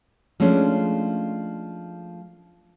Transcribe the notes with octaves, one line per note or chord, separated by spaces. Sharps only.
F3 G#3 A3 C#4 D4